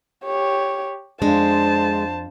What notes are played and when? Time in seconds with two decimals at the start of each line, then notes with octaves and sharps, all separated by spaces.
0.24 G4 C#5
1.22 F2 G#3 D4 C5 A5